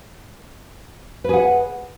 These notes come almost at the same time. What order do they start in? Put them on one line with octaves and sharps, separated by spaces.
B4 G#4 F#5